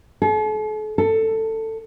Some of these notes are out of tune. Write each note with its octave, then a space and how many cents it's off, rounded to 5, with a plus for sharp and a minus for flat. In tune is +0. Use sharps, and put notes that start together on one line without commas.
A4 -45
A4 +15